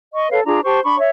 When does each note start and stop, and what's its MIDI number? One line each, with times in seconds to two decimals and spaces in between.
0.14 0.29 75
0.14 0.29 85
0.31 0.41 69
0.31 0.41 71
0.31 0.41 73
0.31 0.41 77
0.46 0.60 62
0.46 0.60 65
0.46 0.60 68
0.46 0.60 82
0.64 0.80 67
0.64 0.80 72
0.64 0.80 81
0.64 0.80 85
0.84 0.97 62
0.84 0.97 83
0.84 0.97 85
0.98 1.10 73
0.98 1.10 76